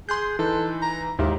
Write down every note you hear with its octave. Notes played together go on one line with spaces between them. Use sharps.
G#4 C6 F#6 G6
E3 D#4 A4
A#5
D#2 G#2 E4 G4